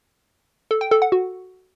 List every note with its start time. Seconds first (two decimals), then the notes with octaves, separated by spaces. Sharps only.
0.71 A4
0.81 G5
0.91 A4
1.02 F#5
1.12 F#4